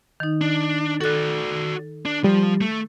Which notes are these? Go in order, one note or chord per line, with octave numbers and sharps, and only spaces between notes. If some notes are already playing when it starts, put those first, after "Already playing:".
D#3 D#4
D4
F#4 A4 D5 F#6
D4
F3 G3
A3